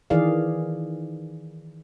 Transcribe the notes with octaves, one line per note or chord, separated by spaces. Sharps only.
D#3 E3 G#4 D5 F5